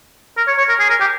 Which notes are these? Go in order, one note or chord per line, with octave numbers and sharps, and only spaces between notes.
A#4
C#5
C#5
A#4
G#4
A#4
G4